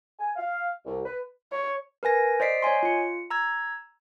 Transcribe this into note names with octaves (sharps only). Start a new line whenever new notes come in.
G#5
F5
C2
B4
C#5
A#4 B4 G#5 A#6
C5 D5 D#5 B6 C7 D7
C#5 D#5 G#5 C6
F4 C#7
A#5 E6 G#6